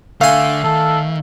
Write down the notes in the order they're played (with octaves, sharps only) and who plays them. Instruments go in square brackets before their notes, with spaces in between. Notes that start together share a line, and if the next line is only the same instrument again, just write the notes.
[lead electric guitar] D3 [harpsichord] A3 G#5 [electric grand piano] F5
[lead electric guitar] D#3 [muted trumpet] A4